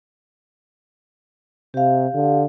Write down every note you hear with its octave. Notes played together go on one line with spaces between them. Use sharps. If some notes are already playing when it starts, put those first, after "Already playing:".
C3 G4 F5
D3